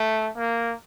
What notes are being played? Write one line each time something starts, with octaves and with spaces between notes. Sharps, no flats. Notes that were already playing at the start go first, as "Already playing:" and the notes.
Already playing: A3
A#3